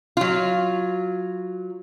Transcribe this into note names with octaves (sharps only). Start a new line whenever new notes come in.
F#3 F4